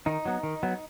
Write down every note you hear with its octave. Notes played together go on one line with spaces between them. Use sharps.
D#3 D#4
F#3 B3
D#3
F#3 B3